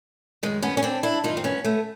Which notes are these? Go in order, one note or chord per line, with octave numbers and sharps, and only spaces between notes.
F#2 D#3 G#3
B3 C#4
C#4
C4 D4
D4 E4
F#2 D#3 D#4 F4
C4
B3 C#4
A3 B3